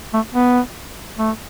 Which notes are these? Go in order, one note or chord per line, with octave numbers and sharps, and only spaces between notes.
A3
B3
A3